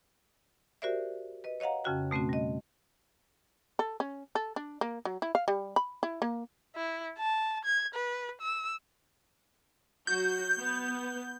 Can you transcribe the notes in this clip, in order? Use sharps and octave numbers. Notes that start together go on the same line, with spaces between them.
F#4 G4 A#4 C5 D5 E5
B4 D#5
C#5 D#5 F5 F#5 A#5
F2 C#3 C#4 F#4 G5
B2 A3 C4 C#4 F#4
G3 D#5
A4
C#4
A4
D4
A#3
F#3
E4
F5
G3
B5
E4
A#3
E4
A5
G#6
B4
E6
F#3 F#4 G6
B3